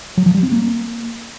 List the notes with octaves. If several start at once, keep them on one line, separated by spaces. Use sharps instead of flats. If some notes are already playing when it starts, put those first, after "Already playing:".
F#3
F3
G3
C4
A#3